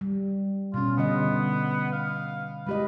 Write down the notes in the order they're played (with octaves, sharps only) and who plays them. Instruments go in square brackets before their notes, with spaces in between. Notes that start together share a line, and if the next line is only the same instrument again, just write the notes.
[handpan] G3
[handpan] B2 C#4 [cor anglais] F4
[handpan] D3 G3 D#5 [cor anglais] B3
[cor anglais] F5
[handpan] G#3 G4 D#5 [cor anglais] B4